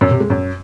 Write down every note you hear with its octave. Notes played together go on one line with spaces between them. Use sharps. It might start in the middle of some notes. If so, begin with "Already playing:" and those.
F#2
C3
G#3
F#2